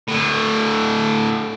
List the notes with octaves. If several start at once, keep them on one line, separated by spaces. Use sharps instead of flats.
A2 D3